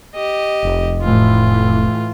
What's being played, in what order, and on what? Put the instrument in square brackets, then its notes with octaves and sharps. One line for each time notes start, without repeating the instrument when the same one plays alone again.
[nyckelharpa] G4 D#5
[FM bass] F1
[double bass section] A2 E3 A3 [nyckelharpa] F4